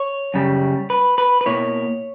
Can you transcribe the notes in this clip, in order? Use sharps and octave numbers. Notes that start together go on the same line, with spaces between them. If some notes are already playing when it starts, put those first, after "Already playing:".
Already playing: C#5
F#2 C#3 G3
B4
B4
B4
B2 A#3 E4 C#5